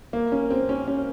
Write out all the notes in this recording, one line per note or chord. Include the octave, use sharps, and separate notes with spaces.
A#3
C#4
C4
C#4
C#4